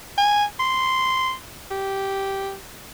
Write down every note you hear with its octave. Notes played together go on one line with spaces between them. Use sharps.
G#5
C6
G4